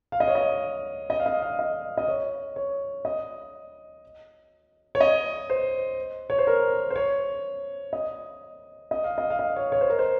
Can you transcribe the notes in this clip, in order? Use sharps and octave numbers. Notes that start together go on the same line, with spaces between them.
F5
D#5
C#5
D#5
D#5
F5
D#5
F5
D#5
D#5
C#5
C#5
D#5
C#5
D#5
C5
C#5
C5
A#4
C5
C#5
D#5
D#5
F5
D#5
F5
D#5
C#5
C#5
C5
A#4
C5